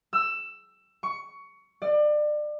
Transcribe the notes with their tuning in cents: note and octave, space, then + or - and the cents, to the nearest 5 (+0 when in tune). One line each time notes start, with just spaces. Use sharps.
E6 +15
C#6 +15
D5 +30